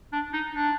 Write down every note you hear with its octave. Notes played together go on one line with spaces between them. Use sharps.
D4
D#4
D4